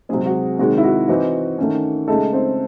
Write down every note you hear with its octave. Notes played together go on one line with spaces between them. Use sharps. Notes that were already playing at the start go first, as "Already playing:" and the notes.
C3 F#3 G#3 C4 G#4
F#4
C3 D#3 G#3 F#4
E4
F#4
E3 C4 D#4 F#4
D#3 A3 C#4
C#3 G#3 A3 D#4 A4
C4 C5